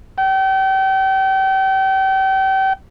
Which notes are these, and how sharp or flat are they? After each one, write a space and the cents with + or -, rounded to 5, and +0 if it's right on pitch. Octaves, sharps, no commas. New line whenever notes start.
G5 -35